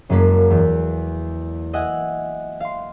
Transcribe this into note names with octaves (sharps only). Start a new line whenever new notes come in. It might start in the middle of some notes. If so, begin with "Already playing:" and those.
F#1 F#2 G#3 A#3 B6
E2
D#5 E5 F#5 G#5
F5 C6